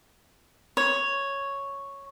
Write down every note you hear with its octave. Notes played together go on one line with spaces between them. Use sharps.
C#5